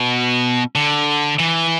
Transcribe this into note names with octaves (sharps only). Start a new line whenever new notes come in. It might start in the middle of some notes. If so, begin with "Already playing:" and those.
Already playing: B2
D3
E3